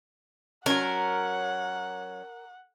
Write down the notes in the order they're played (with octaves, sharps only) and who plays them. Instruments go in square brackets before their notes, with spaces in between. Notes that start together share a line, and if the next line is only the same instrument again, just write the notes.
[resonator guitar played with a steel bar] F#3 C#4 [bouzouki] A#4 [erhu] F#5